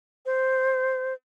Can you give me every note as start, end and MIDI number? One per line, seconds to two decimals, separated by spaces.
0.26 1.14 72